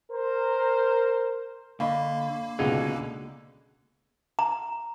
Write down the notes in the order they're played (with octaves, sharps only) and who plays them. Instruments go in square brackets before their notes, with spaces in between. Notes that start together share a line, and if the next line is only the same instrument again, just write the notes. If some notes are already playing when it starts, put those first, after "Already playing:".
[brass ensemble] A#4 C5
[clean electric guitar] D3 [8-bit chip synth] A#3 [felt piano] D#5 B5 C#6 [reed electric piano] F5
[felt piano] C#2 F#5 G#6 [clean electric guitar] B2 D3 D#4 [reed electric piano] G#4
[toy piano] A#5